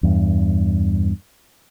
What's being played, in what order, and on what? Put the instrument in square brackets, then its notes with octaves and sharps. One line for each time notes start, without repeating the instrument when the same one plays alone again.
[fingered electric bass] E2 G2